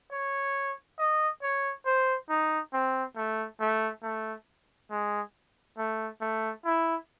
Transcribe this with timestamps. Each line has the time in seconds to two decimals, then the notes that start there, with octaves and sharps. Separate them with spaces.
0.11 C#5
0.98 D#5
1.43 C#5
1.86 C5
2.29 D#4
2.73 C4
3.16 A3
3.60 A3
4.03 A3
4.91 G#3
5.78 A3
6.21 A3
6.65 E4